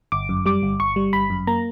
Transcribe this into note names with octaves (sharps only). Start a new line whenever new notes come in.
G1 D6
F#2
G3 D6
G1
G1 C#6
G3
G1 B5
F#2
A#3 A#5